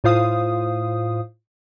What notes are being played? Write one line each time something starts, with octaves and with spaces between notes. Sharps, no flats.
A2 F4 C5 F5 D#6